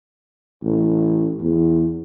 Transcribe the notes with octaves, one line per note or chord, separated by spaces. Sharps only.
A1
E2